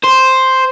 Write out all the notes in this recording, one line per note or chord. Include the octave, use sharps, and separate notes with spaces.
C5